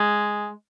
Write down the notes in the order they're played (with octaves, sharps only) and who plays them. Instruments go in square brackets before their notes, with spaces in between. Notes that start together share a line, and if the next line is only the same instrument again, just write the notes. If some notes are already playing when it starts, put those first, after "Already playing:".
Already playing: [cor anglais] G#3